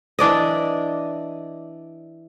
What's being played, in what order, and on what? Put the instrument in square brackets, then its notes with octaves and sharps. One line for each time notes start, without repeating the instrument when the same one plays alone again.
[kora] E3 D4 D5 D#5